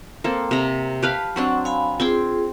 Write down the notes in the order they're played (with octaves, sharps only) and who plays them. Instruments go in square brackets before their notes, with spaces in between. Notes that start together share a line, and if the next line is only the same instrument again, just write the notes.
[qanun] A#3 C4 A4 [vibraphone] C5
[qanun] C3 A#5
[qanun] G4 B4 F5 [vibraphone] A5
[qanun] F#3 C4 D4 [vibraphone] F#5 C#6
[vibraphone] F5 G#5 B5
[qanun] C4 C6 D6 [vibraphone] F4 G#4